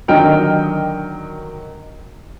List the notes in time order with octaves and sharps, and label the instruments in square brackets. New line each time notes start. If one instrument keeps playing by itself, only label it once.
[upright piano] D3 D#3 F#3 D#5 G5 F6